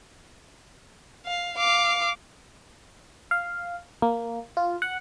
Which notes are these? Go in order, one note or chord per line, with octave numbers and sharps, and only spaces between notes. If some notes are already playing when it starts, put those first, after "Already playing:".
F5
F5 D6
F5
A#3
F4
F#5